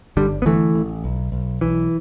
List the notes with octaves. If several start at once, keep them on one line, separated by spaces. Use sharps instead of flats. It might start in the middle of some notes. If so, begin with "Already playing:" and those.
G1 D3 G3
B3
D3 E3 A3
A1
B1
B1
B1 E3